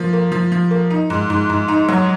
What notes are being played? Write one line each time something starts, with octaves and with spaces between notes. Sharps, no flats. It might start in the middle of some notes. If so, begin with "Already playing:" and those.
Already playing: F3 A#3
A#3
F3
F3
A#3
D#4
G#2
G#2
G#2
D#4
F#3